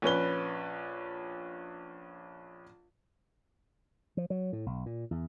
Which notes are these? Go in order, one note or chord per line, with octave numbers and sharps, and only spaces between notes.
A#1 C#4 B4 G7
F3
F#3
A2
B1
A#2
E2